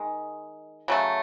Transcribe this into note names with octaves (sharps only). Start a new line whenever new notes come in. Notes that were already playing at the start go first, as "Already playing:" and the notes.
Already playing: D#3 G#3
C#3 F#3 A3